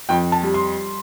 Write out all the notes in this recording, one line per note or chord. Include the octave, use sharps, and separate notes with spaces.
F2 G5
A5
G3
C6